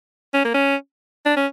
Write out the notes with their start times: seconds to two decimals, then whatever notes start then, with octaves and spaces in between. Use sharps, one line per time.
0.34 C#4
0.45 A#3
0.54 C#4
1.25 D4
1.36 C#4